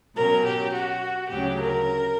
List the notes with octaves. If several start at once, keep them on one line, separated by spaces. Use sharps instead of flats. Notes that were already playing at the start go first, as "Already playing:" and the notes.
B2 F#3 C#4 A#4
G4
F#4
D2 C#3 F#3 C#4 G4
A#4